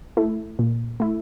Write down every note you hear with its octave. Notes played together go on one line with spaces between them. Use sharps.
A3 E4
A#2
A3 E4